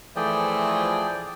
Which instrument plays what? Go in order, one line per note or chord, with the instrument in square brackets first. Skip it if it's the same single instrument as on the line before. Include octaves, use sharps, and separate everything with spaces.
[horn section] E3 F3 A3 [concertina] G#4 D5 G5